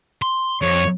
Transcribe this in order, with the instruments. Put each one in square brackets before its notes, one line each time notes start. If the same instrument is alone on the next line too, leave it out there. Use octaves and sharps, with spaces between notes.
[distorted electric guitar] C6
[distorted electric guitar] F2 [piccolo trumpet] C#5